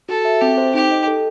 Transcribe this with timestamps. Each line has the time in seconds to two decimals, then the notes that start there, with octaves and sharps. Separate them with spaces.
0.09 F#4 A4
0.25 E5
0.41 C4 G4
0.58 C5
0.74 D#4 G4
0.91 D#5
1.07 A4